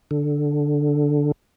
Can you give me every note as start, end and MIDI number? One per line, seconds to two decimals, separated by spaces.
0.11 1.32 50